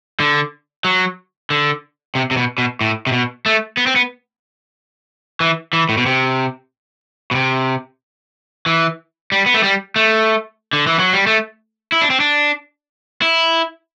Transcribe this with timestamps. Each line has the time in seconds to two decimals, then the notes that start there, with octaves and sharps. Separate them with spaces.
0.20 D3
0.84 F#3
1.50 D3
2.15 C3
2.31 C3
2.37 B2
2.58 B2
2.81 A2
3.07 C3
3.12 B2
3.46 A3
3.77 B3
3.87 C4
3.96 B3
5.40 E3
5.73 E3
5.89 A2
5.97 B2
6.06 C3
7.31 B2
7.35 C3
8.66 E3
9.32 G3
9.46 B3
9.54 A3
9.63 G3
9.96 A3
10.73 D3
10.87 E3
10.99 F#3
11.13 G3
11.27 A3
11.92 E4
12.02 D4
12.10 C4
12.20 D4
13.22 E4